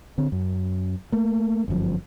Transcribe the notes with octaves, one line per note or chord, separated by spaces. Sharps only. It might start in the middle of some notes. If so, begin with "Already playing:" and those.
D3 C4
F#2
A3 A#3
G1 F#2 D3 F3